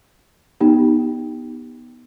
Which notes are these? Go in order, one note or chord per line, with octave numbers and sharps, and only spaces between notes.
B3 D#4 G4